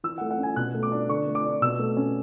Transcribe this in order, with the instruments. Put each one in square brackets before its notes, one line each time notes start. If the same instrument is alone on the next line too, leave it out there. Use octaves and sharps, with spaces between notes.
[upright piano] E3 E6
A3 F#5
F#5
C#4 G#5
B2 F#6
A3
D6
D4
D3 C#6
A3
D6
D4
B2 E6
A3
C#4